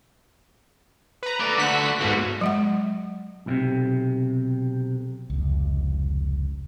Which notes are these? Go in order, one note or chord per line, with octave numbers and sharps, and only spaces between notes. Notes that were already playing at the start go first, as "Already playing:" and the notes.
B4 A#5
A3 D5
D3 A3 F#4 B6
B1 G#2 B2 F#4
F#3 G#3 F#5
B1 A2 C3
F1 C#2